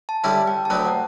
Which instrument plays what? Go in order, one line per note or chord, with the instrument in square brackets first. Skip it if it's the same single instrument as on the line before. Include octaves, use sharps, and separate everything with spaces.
[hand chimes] A5
[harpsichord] D3 G3 C#4 E4 [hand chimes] A5
[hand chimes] G5
A5
[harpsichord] D2 D3 F#3 B3 [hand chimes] G5
[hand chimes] F#5